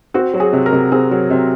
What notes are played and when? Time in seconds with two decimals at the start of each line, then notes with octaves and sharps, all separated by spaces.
0.14 C4 F#4
0.34 F#3
0.40 G#4
0.53 C3
0.66 A#4
0.72 C3
0.92 C4 G#4
1.11 F#3
1.30 C3